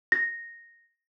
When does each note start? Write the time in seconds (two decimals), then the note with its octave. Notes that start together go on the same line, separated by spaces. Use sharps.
0.12 A#6